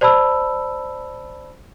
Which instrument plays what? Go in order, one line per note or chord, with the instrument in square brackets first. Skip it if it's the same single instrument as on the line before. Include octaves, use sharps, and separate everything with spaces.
[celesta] C5 D5 A5 B5 E6